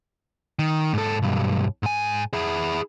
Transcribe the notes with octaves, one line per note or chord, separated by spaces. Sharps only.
D#3
G#2 A4
B1 G2
G#2 G#5
E4 G#4